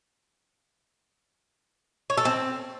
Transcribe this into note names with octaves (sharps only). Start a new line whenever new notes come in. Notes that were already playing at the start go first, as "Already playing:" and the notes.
C#5
A4
C4